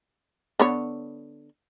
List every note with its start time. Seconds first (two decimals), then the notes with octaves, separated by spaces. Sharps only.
0.59 D3 B3 C#5